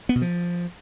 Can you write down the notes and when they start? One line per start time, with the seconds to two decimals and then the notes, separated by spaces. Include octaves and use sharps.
0.09 B3
0.15 B2
0.22 F3